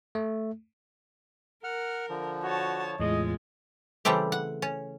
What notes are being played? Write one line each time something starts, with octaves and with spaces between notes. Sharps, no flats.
A3
A#4 F#5 F6
D3 F3
F#4 C#5 A5
E2 A2 G#3 F4 D#5
C#3 E3 G3 A3 C4 G4
F#5
C#4